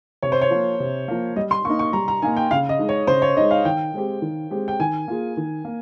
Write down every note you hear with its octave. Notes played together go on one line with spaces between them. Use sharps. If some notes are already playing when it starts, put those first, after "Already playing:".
C3 C#5
C5
C#5
F3 A#3
C3
F3 A#3
G3 D#5
C6
A#3 D#4 C#6
C#6
G3 A#5
A#5
A#3 D#4 G#5
G5
C#3 F5
D#5
G#3 D#4
C#5
C#3 C5
C#5
G#3 D#4 D#5
F5
D#3 G5
G#3 C4 G4
D#3
G#3 C4 G4
G5
D#3 G#5
A#3 F4 G#4
D#3
A#3